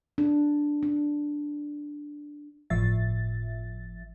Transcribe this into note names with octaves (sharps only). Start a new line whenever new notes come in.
D4
D4
G1 A2 F3 E5 A6